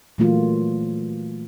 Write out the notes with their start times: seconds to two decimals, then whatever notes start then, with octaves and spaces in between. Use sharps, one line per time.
0.18 A#2 E3 F#3 A3 A#3 F4